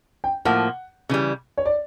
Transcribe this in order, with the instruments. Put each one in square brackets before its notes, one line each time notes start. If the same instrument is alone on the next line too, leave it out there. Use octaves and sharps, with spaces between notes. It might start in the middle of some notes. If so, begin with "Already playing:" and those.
[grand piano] G5
[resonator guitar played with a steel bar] A2 F3 A#3 [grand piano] F#5
[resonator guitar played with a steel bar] C#3 E3 G3
[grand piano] C#5
D5